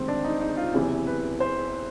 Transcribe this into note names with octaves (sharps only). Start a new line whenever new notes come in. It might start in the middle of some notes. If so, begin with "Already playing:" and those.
Already playing: D2 C3 D#3 G#3 C4
D4
D#4
D#4
F4
F#1 E2 C3 E3
B4
C5